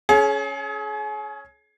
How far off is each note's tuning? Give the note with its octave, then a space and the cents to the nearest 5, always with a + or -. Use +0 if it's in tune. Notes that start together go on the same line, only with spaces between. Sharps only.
C#4 +0 G#4 +35